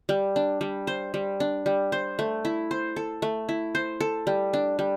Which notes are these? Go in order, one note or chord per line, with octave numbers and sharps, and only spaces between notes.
G3
D4
G3
C5
G3
D4
G3
C5
A3
E4
C5
A4
A3
E4
C5
A4
G3
D4
G3